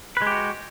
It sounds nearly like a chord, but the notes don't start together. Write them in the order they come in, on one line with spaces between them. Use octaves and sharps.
B4 G#3 G4 F#4